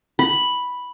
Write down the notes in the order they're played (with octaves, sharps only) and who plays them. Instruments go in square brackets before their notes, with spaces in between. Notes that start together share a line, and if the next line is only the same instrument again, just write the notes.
[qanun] B5